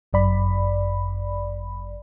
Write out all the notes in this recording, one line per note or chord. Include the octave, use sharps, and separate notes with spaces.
G1 F#2 D5 B5